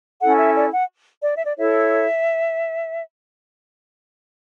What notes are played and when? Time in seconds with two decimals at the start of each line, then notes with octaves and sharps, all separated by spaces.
0.20 C#4 E4 A4 F#5
0.38 E5
0.54 D5
0.72 F#5
1.24 D5
1.34 E5
1.44 D5
1.58 E4 A4 C#5 E5